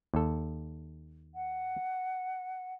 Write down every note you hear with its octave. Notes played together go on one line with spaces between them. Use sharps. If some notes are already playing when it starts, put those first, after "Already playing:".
D#2 A4
F#5